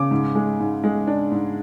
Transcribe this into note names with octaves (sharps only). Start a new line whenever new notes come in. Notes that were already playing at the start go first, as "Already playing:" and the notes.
Already playing: C#3 D6
G#2
G#3
G#2
G#3
D4
G#2